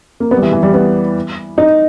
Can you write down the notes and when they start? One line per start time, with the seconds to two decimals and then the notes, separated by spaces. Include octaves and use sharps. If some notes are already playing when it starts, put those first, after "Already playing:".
0.20 A#3
0.31 B3
0.37 G3
0.42 E3
0.52 E3
0.63 G3
0.73 B3
1.58 D#4